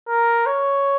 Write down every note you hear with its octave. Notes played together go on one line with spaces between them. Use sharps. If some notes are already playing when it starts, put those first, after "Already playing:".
A#4
C#5